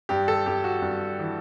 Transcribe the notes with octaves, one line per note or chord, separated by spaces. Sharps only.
G2 G4
A4
G2 G4
F#4
G2
E3